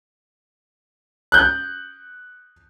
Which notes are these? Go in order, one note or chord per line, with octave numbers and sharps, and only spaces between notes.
F#6 G6